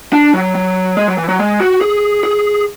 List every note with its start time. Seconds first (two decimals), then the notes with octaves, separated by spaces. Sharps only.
0.13 D4
0.34 F#3
0.55 F#3
0.97 G#3
1.08 F#3
1.18 E3
1.29 F#3
1.39 G#3
1.60 F#4
1.81 G#4
2.23 G#4